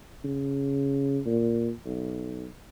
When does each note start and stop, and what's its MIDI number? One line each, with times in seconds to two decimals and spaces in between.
0.24 1.20 49
1.26 1.71 46
1.85 2.46 35